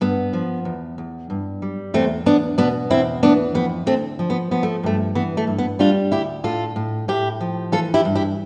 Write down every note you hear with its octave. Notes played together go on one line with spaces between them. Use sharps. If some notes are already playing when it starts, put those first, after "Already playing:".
G2 B3
F3
E2
E2
G2
G3
E2 A3 C4
E2 B3 D4
B2 B3 D4
E2 C4 E4
E3 B3 D4
F2 B3
D2 A3 C4
F3
B3
F3 B3
A3
G2 A3
E3 B3
A3
G2
B3
G3 D4 F4
D2 E4 G4
A2 F4 A4
A2
A2 E4 G4
F3
E3 F4 A4
E4 G4
G2
E4 G4